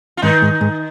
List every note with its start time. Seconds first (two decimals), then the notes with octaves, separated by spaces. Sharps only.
0.17 F4
0.22 G#2 D#3 D#4
0.42 G#2
0.61 G#2